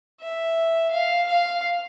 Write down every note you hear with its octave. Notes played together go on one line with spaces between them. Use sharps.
E5
F5
F5